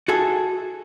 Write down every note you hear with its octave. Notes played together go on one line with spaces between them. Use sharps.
F#4 G#4 A4 E5